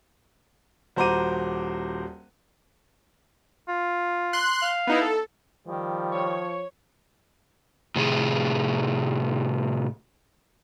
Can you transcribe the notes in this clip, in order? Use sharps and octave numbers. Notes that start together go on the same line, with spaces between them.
D#1 F#4 C5 A#5 D6 D#7
F4
C6 F#6
F5
B3 D#4 E4
A4
D#3 F3 G3
C#5
A2 C3 G#4